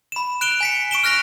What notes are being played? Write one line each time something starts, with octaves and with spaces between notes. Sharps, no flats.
B5 E7
F#6 D7 E7 F7 G7
G#5 B6 C#7
C#6 D7 E7 G7
F6 F#6 A#6 B6 F7